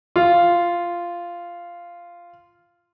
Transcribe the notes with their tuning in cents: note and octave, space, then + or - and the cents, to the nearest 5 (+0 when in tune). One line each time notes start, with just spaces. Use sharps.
F4 -10